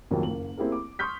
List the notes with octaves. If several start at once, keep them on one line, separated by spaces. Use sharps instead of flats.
A#1 F2 C3 D#3 F#3 A#3
F#1 A#3 F#7
A#3 C4 E4 G4 G#4 A#4
D6
C6 C#6 D#6 F6 G6 B6